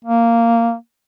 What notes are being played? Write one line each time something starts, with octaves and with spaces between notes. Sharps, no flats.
A#3